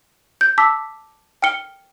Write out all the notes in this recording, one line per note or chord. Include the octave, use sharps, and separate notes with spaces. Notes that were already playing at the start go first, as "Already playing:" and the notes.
G6
A5 D6 E6 B6
G5 F6 C#7 G7